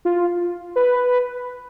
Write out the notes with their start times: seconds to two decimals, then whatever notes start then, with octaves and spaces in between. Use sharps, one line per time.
0.05 F4
0.76 B4